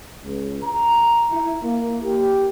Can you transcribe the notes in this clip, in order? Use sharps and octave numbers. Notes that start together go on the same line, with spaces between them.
C#2
A#5
E4
A#3
G4